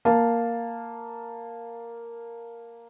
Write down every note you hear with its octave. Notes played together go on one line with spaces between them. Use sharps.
A#3 F5 A5